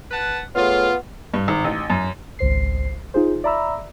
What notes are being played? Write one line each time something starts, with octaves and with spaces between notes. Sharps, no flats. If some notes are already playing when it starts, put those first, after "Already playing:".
B4 F#5 A5
A3 B3 F4 G#4 C#5
G2
G#1
A1
F#2
G#1 C#2 C5 C7
D#4 F4 G#4 C5
D5 E5 A#5 B5 E6